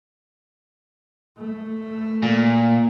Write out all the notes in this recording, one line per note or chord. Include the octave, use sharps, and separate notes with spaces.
A3
A#2